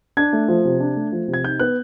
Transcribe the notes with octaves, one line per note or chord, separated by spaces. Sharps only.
D4 G#6
A3
F3
C3
D4
A3
F3
C3
G#6
D#4 G6
B3 F#6